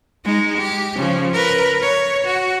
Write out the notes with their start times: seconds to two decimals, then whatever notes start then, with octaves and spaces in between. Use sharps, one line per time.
0.25 G#3 D#4
0.58 G4
0.97 C#3 F3
1.34 A#4 B4
1.82 C#5
2.25 F#4